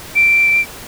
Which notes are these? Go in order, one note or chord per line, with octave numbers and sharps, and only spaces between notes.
D7